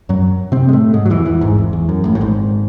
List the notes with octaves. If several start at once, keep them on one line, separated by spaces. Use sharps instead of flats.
F#2 F#3
C3 C4
G#3
A2 A3
G#2 G#3
F#3
E2 E3
E2 E3
G#1 G#2
E2
E2
F#2
A1 A2
A2
G#1 G#2